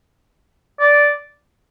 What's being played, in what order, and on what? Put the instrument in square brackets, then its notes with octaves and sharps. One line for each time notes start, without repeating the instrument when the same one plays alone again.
[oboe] D5